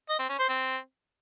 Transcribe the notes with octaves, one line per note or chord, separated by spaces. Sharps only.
D#5
C4
C#4
C5
C4